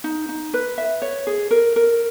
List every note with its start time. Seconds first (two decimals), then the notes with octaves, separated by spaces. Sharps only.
0.04 D#4
0.29 D#4
0.54 B4
0.78 E5
1.02 C#5
1.27 G#4
1.51 A#4
1.76 A#4